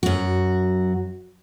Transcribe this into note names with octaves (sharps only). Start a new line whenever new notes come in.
F#2 F#4